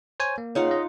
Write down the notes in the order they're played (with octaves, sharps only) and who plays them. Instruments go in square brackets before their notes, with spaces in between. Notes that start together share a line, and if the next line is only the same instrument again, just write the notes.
[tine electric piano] C5 C#5 G#5
A#3
[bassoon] C#3 [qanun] D#4 F4 F#5
[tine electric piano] D#5